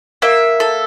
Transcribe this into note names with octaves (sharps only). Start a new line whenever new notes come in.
A#3 E5
A4